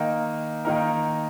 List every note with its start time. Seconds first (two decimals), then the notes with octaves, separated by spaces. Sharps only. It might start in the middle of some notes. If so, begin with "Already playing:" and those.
Already playing: D#3 A#3 D#4 A#4
0.65 D#3 A#3 D#4 A#4